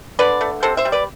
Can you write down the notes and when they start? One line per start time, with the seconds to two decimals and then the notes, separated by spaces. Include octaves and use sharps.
0.19 D3 B4 D5
0.41 A3
0.63 C3 A4 C5
0.77 C5 E5
0.85 G3
0.92 B4 D5